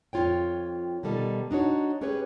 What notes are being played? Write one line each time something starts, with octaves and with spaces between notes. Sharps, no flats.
F2 F3 F4 C#5 G5
B2 D#3 G3 A4 D#5
D4 D#4 F#4 C#5
C#4 G4 G#4 B4 C#5